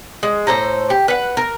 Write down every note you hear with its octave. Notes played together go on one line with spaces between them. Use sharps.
G#3
A2 A4 C5 A#5
G4
B4 F#5
A#4